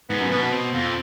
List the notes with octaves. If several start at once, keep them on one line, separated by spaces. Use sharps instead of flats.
G#2 B3
F#2
B2 B3
C4
F2